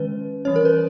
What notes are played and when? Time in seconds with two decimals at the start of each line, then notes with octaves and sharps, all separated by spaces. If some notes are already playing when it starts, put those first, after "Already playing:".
Already playing: D#3 G#3 C#4 B4
0.45 E3 G3 C#4 C#5
0.56 A#4
0.65 B4